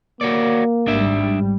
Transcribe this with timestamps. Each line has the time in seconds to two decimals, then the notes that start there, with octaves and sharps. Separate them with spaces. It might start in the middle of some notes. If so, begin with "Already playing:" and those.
0.21 A#3 F#4 C#5 D5
0.88 G#1 G3 D4 E5